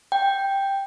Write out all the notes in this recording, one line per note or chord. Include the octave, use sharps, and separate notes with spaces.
G5